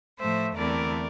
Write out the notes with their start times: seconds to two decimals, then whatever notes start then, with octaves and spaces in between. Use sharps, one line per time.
0.20 A2 F3 A3 C5 E5
0.56 E2 D3 A3 C4 E4 A#4 D5